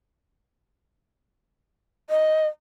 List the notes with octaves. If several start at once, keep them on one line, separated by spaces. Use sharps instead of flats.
D#5